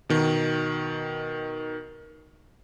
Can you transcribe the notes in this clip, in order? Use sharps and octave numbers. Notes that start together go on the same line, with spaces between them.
B2 D#3